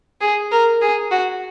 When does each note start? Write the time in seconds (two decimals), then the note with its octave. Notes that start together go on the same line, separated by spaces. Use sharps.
0.21 G#4
0.52 A#4
0.82 G#4
1.11 F#4